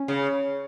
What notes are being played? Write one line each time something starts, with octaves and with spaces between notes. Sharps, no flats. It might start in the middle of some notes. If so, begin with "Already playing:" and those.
Already playing: C#4
C#3